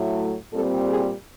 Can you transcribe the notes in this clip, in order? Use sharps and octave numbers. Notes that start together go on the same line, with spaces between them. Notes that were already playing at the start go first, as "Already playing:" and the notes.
Already playing: A2 F#3 A3
A#2 G3 C4 A4
G#4